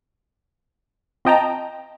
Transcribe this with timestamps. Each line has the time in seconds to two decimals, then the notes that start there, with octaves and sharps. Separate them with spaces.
1.25 C4 F4 D#5 G5 A5 A#5